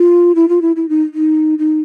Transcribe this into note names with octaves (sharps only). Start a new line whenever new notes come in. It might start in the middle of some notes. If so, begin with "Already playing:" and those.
Already playing: F4
E4
F4
E4
E4
D#4
D#4
D#4